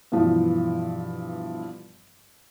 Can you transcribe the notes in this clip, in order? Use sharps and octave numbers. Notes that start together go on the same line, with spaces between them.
G2 B2 E3 F3